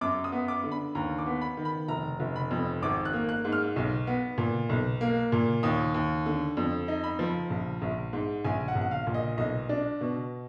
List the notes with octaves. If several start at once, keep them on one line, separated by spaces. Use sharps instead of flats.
F#2 D6
D#6
B3
D6
D3
B5
D#2 A#5
D6
B3
B5
D#3
B5
F1 A#5
F1
B5
F2
G#1 D6
F#6
A#3
F#6
G#2
F6
B1
B3
A#2
B1
A#3
A#2
D#2 D#6
D#2
D3
F2
D#4
B5
F3
A#1
A#1
G#2
A#1 G#5
F#5
A#1
F#5
F5
A#2
D#5
B1 D#5
D4
B2